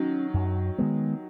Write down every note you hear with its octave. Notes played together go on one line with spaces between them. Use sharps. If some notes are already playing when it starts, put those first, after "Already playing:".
Already playing: D#3 F#3 C#4
F#2
D#3 G#3 B3